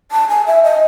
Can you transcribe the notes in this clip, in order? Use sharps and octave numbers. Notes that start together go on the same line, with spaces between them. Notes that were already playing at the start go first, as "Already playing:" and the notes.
A5
G#5
E5
D#5